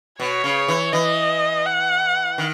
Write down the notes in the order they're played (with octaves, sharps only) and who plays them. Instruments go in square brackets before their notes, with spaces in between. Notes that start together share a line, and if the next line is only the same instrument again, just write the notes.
[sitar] B2 [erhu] C#5
[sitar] C#3
E3
[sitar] E3 [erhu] D#5
[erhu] F#5
[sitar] D#3